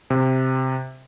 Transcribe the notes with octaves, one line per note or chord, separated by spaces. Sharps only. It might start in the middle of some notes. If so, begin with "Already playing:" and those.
C3